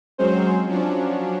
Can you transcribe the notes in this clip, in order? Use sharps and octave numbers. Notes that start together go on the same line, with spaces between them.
F#3 G#3 C4 C#4 C5
F3 F#3 C#4 D4